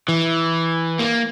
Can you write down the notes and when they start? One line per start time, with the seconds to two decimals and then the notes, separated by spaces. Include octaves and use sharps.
0.08 E3
0.99 A#3